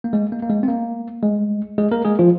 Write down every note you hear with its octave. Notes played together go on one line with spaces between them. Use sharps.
A#3
G#3
A#3
A#3
G#3
C4
A#3
G#3
G#3 G#4
A#3 A#4
G#3 G#4
F3 F4